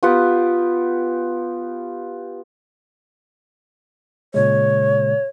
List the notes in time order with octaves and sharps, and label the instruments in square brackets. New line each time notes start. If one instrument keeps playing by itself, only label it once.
[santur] B3 F4 G4 F#5
[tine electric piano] A#2 C#3 G#3 [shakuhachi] C#5